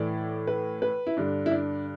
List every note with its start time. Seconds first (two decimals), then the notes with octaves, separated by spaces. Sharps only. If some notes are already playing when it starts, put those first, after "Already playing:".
Already playing: A2 E3 D5
0.47 B4
0.82 B4
1.07 E4
1.17 G2 D3 D4
1.46 E4
1.51 D4